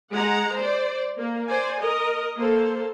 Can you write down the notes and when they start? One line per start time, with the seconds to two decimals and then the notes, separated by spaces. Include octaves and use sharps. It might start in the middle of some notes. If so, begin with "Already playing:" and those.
0.12 G#3 F#5 A#5
0.55 C5 D5
1.18 A#3
1.47 C5 D5 G#5
1.80 A#4 D#5
2.38 A#3 A4 C5